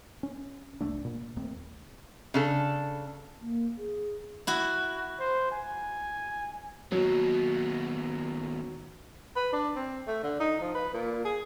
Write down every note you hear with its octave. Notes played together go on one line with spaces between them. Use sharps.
C#4
F1 C2 A3 D4
A#2
D#1 D#2 A3 C4
C#3 D4 A4
A#3
G#4
E4 F#4
C5
G#5
D#2 B2 F#3
B4
D4
C4
A3
D3
D#4
F3
B4
A#2
G#4